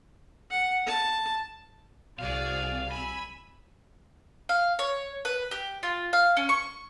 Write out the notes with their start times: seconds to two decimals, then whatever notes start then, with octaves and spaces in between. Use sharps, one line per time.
0.51 F#5
0.87 A5
2.19 C2 F#4 G#4 D5 F5
2.92 G#5 B5 E6
4.49 F5
4.79 C#5
5.25 B4
5.51 G4
5.83 F4
6.13 F5
6.37 C#4
6.49 C#6